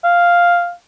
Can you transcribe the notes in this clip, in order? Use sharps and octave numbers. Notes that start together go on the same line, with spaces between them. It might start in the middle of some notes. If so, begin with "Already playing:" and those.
F5